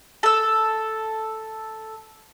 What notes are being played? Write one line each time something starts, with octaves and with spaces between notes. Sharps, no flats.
A4 E6